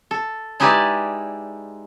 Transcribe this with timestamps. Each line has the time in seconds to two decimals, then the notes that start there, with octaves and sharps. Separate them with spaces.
0.11 A4
0.60 G#3 D#4 E4 G4 B4 D5